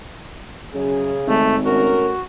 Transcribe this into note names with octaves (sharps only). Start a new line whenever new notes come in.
F#2 C#3 G#4
G#1 A3
A3 C#4 F#4 A#4